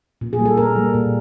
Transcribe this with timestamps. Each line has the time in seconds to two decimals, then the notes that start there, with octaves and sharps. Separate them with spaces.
0.21 A#2
0.33 G#4
0.39 G3 A#3
0.45 A4
0.57 A#2 A#4
0.76 G3 A#3
0.94 A#2